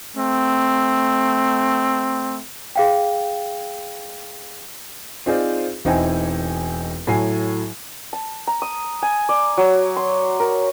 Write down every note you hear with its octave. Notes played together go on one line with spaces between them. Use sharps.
A3 C4
G#4 F5 G5
C4 D#4 F4 G#4 C5 D5
E1 C4 D#4 E4 G5 G#5
A2 F#3 G#5 C7
A5
A#5
D#6
G#5
D5
F#3
C6
A#4